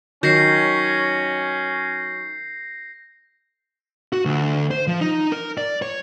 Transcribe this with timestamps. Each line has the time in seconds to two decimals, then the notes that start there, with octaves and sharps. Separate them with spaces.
0.23 D#3 F#3 C#4 G6 A#6 C7
4.13 F#4
4.25 D2
4.71 C5
4.87 F3
5.01 D#4
5.32 A#4
5.58 D5
5.82 C#5